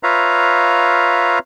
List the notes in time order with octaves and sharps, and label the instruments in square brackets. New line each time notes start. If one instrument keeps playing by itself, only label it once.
[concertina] F4 B4 C#5 E5 F5 A#5